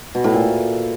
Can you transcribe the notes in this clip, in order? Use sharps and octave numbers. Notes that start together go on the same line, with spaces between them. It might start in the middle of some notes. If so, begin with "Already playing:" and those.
B2
A2
A#2